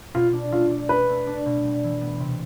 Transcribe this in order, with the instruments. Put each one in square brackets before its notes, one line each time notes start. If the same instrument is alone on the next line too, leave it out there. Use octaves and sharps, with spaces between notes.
[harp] B2 [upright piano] F4
[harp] D4
[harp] A3 [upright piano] F4
[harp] D4
[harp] D4 [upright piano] B4
[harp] A3
D4
B2
G3
E3
B3
C3